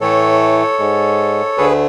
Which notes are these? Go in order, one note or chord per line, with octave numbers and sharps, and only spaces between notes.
A2 E3 A3 A4 C#5
G#2 G#3
D2 D3 A3 G#4 B4